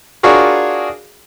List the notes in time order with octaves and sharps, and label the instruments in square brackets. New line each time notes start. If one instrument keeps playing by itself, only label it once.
[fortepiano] D4 F4 F#4 G#4 A#4 C#5